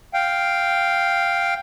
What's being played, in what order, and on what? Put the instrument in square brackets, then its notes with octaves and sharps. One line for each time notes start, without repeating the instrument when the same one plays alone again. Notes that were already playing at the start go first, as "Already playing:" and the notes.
[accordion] F5 G5